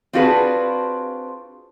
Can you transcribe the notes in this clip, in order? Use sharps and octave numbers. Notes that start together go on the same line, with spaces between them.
C4 D4 F4 F#4 G#4 B4